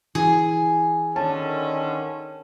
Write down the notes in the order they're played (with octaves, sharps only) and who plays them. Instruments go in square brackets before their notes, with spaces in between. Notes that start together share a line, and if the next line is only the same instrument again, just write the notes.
[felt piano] E3 [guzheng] G#4
[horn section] D3 D#3 C#4 [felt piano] A5